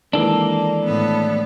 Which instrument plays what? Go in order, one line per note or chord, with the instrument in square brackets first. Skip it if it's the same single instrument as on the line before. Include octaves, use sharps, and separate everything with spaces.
[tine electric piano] D#3 E3 G#3 [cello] A#3 [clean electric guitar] D4 A4
[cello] A2 B3